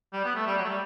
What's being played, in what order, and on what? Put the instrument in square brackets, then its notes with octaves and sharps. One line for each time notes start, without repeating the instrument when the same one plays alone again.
[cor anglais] G3
B3
A3
G3
F#3
A3
G3